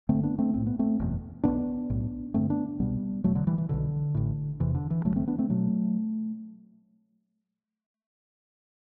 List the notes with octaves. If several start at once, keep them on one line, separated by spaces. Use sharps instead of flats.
G1 F#2 D3 A3 C4
B3 D4
A3 C4
B1 A2 C4
B3
A3 C4
F#1 E2 B2
B1 B2 B3 D4
B1 A2
A1 G2 D3 A3 C4
B3 D4
C2 B2 G3 B3
E1 E2 B2 F#3 A3
D3 F#3
E3 G3
E3
B1 B2 D3
A1 A2
E1 E2 C3 E3
D3
E3
F#1 F#2 D3 F#3 A3
A3 C4
B3 D4
A3 C4
B2 F#3 A3